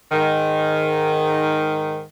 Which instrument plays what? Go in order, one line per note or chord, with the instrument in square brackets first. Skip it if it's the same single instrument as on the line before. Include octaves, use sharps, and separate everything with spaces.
[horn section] G#2 D#3